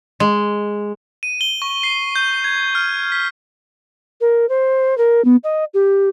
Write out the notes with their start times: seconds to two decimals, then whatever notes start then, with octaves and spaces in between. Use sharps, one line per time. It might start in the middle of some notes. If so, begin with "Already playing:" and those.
0.20 G#3
1.23 D#7
1.41 G7
1.62 C#6
1.83 C7
2.16 G6
2.44 G#6
2.75 F6
3.12 B6
4.21 A#4
4.49 C5
4.98 A#4
5.25 B3
5.44 D#5
5.74 G4